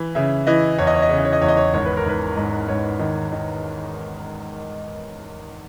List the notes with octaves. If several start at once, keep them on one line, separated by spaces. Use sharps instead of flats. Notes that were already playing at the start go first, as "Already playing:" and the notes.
Already playing: E3
C#3 E5
E3 D#5
E2 C#5
D#5
C#5
D#5
C#3 C#5
D#5
C#5
D#5
E2 C#5
D#5
C#5
G#1 C#5
B4
A#4
G#1 B4
G#2
G#2 C#5
D#3
D#3